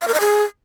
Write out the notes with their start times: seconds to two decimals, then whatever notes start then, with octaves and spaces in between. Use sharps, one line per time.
0.02 F5
0.08 A#4
0.14 D#5
0.20 G#4